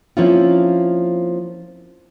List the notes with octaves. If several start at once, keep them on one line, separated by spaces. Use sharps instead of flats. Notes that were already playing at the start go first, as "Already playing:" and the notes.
F3 A#3 C4 C#4 E4 F4